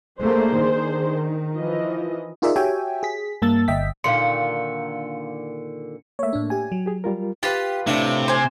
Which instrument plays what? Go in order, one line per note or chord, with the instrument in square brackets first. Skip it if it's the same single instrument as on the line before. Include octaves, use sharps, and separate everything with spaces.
[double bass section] A3 A#3 [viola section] D4 G#4 C5
[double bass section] D#3
[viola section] E3 F3 D#5
[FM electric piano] D#4 F4 G#4 A#4 D5 E5
F#4 G4 C#5 E5 G5 G#5
G#4 B6
G2 A#3 A5 E6 A6
G1 D#5 E5 G5 B6
[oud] A#2 D3 D#3 [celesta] F5 C6 [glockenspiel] C#7
[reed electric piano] A3 A#3 [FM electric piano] C#5 E5
[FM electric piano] A2 D4
G4 G#5
F#3
[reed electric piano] G4 G#4
G3 F4 A#4
[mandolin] F4 B4 [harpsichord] G4
[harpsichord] A2 A3 D4 [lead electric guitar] C3
[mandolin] C5 G#5